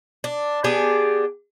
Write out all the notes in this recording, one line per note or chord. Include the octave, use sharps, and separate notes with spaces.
D4
B3 D4 G4 G#4